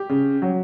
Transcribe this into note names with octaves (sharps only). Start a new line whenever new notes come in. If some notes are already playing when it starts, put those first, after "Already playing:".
Already playing: G4
C#3
F#3